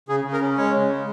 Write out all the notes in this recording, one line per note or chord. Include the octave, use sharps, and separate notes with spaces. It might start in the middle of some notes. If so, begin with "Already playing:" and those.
C#3 G#4
C#3
A#4
C#4
G#3 C#5
C#3
G#3